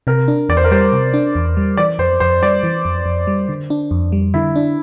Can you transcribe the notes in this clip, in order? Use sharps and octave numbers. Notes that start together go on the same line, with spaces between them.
C3 A#4
D4
E2 D5
C5
A#4
G3 C5
C3
D4
E2
G3
E3 D5
F2 C5
F2 C5
G3 D5
E3
F2
F2
G3
D3
D4
F2
G3
D3 E4
D4